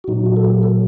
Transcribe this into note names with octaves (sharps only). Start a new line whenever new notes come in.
F#4
A#2 F#3 D#4
F#4
A4
G4
A4